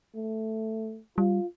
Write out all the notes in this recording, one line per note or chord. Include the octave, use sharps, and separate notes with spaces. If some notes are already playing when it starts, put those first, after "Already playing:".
A3
G3 F4